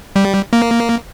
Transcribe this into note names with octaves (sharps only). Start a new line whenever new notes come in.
G3
A#3